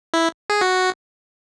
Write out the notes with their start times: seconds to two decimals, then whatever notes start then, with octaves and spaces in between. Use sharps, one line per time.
0.14 E4
0.50 G#4
0.61 F#4